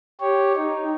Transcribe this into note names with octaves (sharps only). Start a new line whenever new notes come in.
G4 C#5
D#4